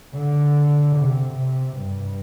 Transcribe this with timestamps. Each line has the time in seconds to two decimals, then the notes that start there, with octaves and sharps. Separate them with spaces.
0.15 D3
0.96 C3
1.37 C3
1.77 G2